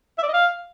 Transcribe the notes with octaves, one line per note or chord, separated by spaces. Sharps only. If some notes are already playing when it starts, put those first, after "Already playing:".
E5
D5
D#5
F5